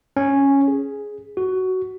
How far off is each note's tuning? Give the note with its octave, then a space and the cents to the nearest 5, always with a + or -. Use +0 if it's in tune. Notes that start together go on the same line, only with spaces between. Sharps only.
C#4 -5
G#4 +5
F#4 +15